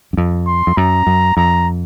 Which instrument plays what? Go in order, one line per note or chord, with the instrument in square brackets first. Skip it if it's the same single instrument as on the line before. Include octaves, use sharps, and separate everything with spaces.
[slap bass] F#2
F2
[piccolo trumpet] C6
[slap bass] F2
[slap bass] F#2 [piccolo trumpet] A#5
[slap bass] F#2
[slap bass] F2 [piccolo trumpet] A#5